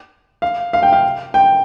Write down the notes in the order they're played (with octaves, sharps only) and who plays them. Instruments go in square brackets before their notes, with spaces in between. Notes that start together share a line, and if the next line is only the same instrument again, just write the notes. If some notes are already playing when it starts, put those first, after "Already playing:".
[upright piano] F5
F5
G5
F5
G5